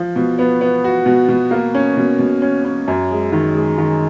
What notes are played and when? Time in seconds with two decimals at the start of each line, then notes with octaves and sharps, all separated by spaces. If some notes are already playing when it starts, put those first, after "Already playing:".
Already playing: F3
0.16 B2
0.39 B3
0.61 B3
0.84 F#4
1.06 B2
1.29 B2
1.51 A#3
1.75 C#4
1.97 B2
2.19 B2
2.42 C#4
2.65 C#4
2.88 F#2
3.11 G#3
3.32 D#3
3.55 G#3
3.78 D#3